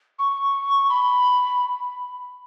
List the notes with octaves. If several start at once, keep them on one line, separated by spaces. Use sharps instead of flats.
C#6
B5